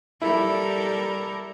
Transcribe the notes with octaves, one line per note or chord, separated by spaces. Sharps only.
G3 E4 A4 A#4